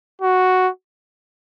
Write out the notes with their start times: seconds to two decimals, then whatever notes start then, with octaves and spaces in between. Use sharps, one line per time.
0.22 F#4